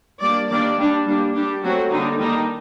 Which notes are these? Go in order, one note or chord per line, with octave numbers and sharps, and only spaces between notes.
G3 A#3 D4 D5
D#3 G3 A#3 D4 D5
G3 D4
G3 A#3 D4
G3 D4 G4
F#3 A3 C4 F#4
D3 G3 A#3 D4 D#4
D#3 G3 A#3 D4 D#4